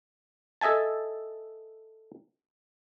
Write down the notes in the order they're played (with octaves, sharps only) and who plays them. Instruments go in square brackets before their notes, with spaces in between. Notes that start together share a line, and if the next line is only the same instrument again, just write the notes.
[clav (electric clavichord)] A4 D#5 E5 G#5 A5